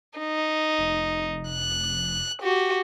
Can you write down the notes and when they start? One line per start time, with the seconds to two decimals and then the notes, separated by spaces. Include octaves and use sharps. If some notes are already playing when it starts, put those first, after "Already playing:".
0.19 D#4
0.78 F1
1.50 F#6
2.43 F#4 G4